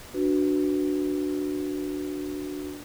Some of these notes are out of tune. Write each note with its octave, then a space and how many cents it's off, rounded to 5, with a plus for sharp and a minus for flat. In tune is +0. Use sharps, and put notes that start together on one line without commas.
D4 +0 F#4 +0 B4 +0